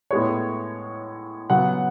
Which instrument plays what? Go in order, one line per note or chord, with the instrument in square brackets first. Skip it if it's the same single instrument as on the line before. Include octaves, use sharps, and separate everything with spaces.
[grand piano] A2 G#3 B3 C#5
C#3 F#3 B3 F#5